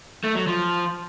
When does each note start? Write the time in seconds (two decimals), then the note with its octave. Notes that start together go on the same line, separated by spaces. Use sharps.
0.24 A3
0.35 F#3
0.47 F3